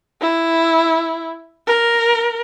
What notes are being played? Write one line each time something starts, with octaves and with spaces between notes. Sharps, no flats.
E4
A#4